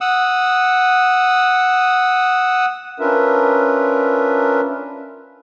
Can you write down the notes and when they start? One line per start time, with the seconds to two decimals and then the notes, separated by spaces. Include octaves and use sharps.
0.01 F#5 D#6 E6
3.00 C#4 D4 F4 A#4 B4 E5